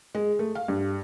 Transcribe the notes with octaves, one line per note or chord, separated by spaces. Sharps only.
G#3
A3
F5
G2